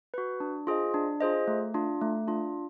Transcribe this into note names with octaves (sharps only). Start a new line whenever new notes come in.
F#4 B4
D4
F4 G#4 C5 D#5
D4
F4 G#4 C5 D#5
A3
D4 F4
A3
D4 F4